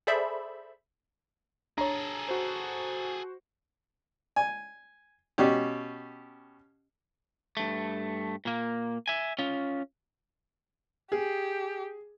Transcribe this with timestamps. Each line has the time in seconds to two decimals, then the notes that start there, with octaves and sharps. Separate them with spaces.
0.07 G#4 A4 C5 D5 E5 B5
1.78 D4 G#4 A4 C#5 A#5
2.28 F#4 C5
4.36 G#5
5.38 B2 C#4 G4
7.57 G2 A3
8.45 A#2 A#3
9.08 E5 G#5
9.39 C#4 F4
11.12 G4 G#4